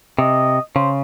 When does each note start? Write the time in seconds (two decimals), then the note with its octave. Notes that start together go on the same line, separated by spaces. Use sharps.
0.18 C3 D#5
0.75 C#3 C5